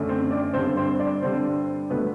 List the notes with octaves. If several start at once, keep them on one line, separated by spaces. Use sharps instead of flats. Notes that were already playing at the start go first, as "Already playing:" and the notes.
Already playing: F#2 D3 A3
C4 C5
D4 D5
G2 D3 G3 C4 C5
C4 C5
D4 D5
G2 D3 G3 C4 C5
D3 F#3 A3 B3 B4